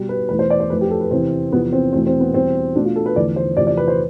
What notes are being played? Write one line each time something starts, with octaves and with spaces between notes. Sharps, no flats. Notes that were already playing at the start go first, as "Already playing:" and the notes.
Already playing: B2 G3
B4
E2 B2 A3 B4
C5
D5
C5
F2 E3 A3 B4
G4
A4
B4
E2 C3 E3 C4
E2 C3 F3 B3
C4
E2 B2 A3 C4
C4
B3
E2 B2 G3 C4
B2 A3 D4
F4
A4
B4
E2 D3 F3 A3 D5
C5
E2 C3 F3 A3 D5
D5
B4
C5